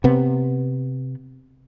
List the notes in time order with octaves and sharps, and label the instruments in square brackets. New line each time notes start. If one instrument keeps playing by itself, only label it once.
[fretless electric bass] C3 B3